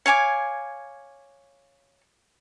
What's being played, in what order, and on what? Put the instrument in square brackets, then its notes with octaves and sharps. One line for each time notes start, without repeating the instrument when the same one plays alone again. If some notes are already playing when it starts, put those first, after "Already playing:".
[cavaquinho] C#5 F5 G#5 D6